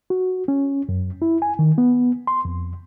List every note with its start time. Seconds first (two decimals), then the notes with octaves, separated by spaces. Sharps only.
0.10 F#4
0.48 C#4
0.89 F#2
1.22 E4
1.42 G#5
1.59 D#3
1.78 B3
2.27 C6
2.45 F2